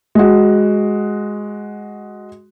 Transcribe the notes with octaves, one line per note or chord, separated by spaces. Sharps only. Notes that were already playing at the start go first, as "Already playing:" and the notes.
G#3 F#4